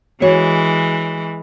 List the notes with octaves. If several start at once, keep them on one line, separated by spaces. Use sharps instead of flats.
E3 G#3 F#4 C#5